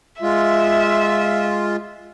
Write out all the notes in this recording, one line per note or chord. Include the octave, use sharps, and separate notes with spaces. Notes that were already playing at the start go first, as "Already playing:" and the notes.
G#3 F4 E5